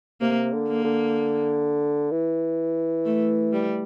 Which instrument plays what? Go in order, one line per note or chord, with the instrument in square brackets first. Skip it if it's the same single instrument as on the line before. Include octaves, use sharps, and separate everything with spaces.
[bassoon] C3 [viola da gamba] A#3
[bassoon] D3
[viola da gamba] A#3
[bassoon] D3
E3
[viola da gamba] A3
G3